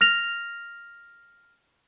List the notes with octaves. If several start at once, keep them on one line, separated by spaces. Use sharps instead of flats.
F6 A#6 F7